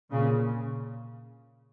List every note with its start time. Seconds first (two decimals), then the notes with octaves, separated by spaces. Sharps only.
0.11 A#2 C#3